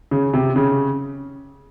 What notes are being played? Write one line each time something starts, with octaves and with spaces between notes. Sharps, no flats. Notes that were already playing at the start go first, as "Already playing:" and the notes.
C#3
C3
C#3